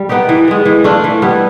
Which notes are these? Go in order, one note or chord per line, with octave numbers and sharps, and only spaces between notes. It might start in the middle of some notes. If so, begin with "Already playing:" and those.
Already playing: G3
B3 D#4 G4
E3
G#3 B3
E3
A3 D4 F4
E3
G3 B3 E4